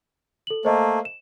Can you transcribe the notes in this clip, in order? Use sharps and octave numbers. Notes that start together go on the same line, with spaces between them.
A4 F#7
A3 A#3 C5 D#5
E7